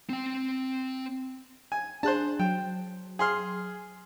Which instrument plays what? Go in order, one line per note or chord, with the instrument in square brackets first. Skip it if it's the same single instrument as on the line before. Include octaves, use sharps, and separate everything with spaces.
[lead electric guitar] C4 G5
[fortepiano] G#5
[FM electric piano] D4 G#4 F#6 [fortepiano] C5 A5
[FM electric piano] F#3 [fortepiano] G5
[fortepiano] G#4 C6 F6